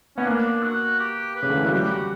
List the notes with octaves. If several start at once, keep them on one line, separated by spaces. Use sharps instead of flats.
B3 C#4
A#3 D4
F#4
G4
B4
C#3
D3
E3
F#3 F#4
G3 G4
F#4